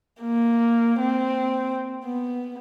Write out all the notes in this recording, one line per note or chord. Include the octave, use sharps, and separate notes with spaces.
A#3
C4
B3